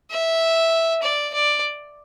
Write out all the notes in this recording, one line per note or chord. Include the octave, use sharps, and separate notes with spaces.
E5
D5
D5